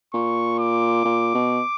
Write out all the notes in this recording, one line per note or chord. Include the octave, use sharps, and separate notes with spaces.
A#2 C#6
D6
A#2
B2